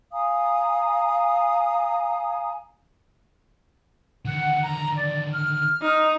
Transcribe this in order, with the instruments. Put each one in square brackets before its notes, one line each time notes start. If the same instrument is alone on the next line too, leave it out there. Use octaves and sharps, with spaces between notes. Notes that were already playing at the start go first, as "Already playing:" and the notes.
[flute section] F5 G#5 A#5 D#6
[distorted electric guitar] D3 D#3 [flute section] F#5
[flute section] A#5
D5
F6
[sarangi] D#4